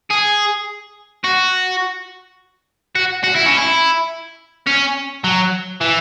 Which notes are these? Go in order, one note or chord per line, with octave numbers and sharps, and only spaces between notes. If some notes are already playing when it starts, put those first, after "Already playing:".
G#4
F#4
F#4
F#4
E4
C#4
E4
C#4
F#3
E3